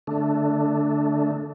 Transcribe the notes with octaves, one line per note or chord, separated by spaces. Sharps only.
D3 A3 D4